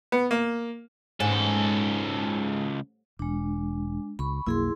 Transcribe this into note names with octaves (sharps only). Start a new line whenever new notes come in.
B3
A#3
C#2 G#2 A4
E1 G#3 D4
C#2 B5 C#6
B1 F2 A#3 E4 G#4 C6